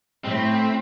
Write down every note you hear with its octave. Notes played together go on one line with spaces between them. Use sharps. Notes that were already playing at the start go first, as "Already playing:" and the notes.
A2 C4